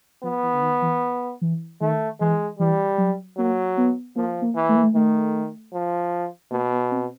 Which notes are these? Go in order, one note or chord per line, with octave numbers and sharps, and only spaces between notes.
F3 B3
E3
D3
D#3
E3
E3
D#3 A3
E3 G#3
E3 G3
F#3
F#3 A#3
B3
F3 A#3
A#3
E3
A3
A#3
A3
D#3 A3
F3
B2 A#3
B3
C4